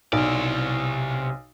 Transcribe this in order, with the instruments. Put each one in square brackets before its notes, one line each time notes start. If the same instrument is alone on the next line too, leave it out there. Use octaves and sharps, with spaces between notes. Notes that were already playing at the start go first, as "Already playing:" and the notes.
[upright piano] B1 [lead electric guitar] C3 D5